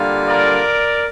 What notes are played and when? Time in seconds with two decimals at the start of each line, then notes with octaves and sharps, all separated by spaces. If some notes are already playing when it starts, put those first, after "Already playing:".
Already playing: D3 G3 A#3 F4
0.27 A#4 D5